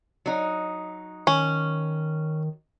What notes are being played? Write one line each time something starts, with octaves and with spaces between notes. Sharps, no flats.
F#3 D#4
D#3 C#4